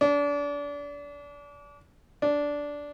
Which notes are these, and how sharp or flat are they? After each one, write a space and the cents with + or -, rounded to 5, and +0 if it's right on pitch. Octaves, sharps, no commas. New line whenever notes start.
D4 -30
D4 -10